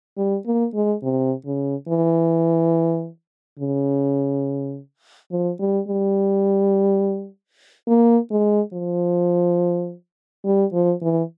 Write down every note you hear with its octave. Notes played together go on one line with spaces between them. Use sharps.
G3
A#3
G#3
C3
C#3
E3
C#3
F3
G3
G3
A#3
G#3
F3
G3
F3
E3